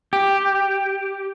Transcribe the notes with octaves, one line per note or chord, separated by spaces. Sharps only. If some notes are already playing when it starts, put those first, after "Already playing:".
G4